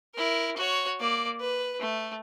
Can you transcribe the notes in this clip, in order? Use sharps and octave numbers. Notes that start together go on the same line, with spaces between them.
E4 A#4
F#4 C#5
A#3 D5
B4
A3